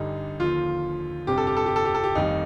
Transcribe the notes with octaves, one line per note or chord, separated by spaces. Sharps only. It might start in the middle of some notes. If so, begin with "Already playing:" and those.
Already playing: G1 G2 D3 G3 D#4
D#2 D3 F3 F4
G1 F2 C3 F3 G4
A4
G4
A4
G4
A4
G4
A4
G4
F1 F2 D#3 G3 D#4